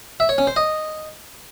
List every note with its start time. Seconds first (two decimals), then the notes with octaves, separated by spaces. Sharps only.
0.20 E5
0.29 C#5
0.38 C#4
0.47 C5
0.56 D#5